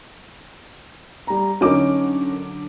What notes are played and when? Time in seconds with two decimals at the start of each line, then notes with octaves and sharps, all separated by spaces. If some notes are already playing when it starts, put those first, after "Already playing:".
1.27 G3 A#5
1.61 D3 F#3 C#4 D#4 A#4 D6